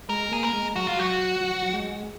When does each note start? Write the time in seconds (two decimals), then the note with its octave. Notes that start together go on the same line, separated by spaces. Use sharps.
0.09 G#3 A#4
0.31 A#3 G#4
0.43 A#4
0.53 G#3
0.76 F#3 F#4
0.87 F4
0.97 F#3 F#4
1.41 F#3
1.62 F#3
1.74 G#3